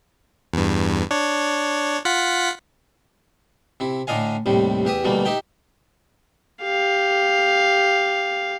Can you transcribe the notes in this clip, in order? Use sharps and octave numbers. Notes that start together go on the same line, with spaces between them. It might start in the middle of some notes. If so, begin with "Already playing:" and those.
E2 G2
D4 C#5
F4 F#5 B6
C3 E4
A2 D3 D4 D#5 F5 G#5
D#2 A2 C3 G3
E2 G4 E5 D#6
D2 B2 E3 G3 A3 A#3
D#4 G4 E5 G5
G4 F5